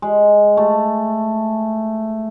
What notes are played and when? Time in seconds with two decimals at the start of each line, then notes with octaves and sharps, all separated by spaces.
0.02 G#3
0.57 A3